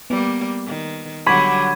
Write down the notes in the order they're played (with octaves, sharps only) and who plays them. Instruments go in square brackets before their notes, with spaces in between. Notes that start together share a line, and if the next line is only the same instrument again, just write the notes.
[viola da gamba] G3 A#3 [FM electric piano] B3
[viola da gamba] D#3
[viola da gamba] D3 F#3 G3 [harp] B5 [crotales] C#6 D6 G#6